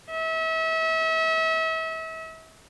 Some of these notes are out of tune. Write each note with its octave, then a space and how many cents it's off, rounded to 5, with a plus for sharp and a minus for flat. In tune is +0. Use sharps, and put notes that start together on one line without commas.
E5 -35